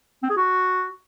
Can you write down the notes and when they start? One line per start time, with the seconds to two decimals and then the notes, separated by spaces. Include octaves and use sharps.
0.23 C4
0.30 G#4
0.37 F#4